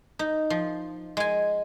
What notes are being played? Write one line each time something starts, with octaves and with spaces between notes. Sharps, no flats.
D#4
F3
G#3 G#5